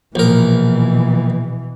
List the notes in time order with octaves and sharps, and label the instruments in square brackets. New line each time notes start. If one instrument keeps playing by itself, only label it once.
[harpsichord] A#1 A#4 [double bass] B2 E3